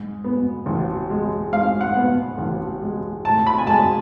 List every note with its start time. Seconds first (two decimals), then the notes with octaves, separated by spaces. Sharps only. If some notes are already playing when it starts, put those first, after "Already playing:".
Already playing: G#2
0.24 B3
0.66 A1
1.10 G#3
1.52 G#2 F5
1.81 F#5
1.96 B3
2.38 A1
2.82 G#3
3.25 A2 A5
3.47 B5
3.58 G#5
3.67 G#3 A5